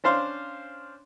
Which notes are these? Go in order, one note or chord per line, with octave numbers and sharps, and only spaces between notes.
C#4 D4 C5 F5 C6